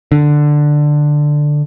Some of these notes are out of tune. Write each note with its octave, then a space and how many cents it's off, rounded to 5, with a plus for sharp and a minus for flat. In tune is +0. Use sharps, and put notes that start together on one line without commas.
D3 +10